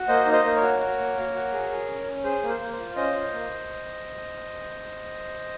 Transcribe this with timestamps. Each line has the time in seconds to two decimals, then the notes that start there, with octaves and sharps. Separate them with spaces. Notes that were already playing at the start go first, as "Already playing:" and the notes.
Already playing: F#4
0.08 A#3 C5 D#5
0.26 D#4
0.32 C5 D#5
0.45 A#3
0.56 A#4 C#5
0.62 F#4
0.80 F#4
0.98 A#3
1.17 A#3
1.35 F#4
1.53 G#4
1.70 G#4
1.88 C#4
2.07 C#4
2.24 G#4 C5
2.42 A#3
2.49 C5
2.60 A#3
2.73 C5
2.79 F4
2.96 C#4 C5 D#5
3.15 F4
3.33 A#3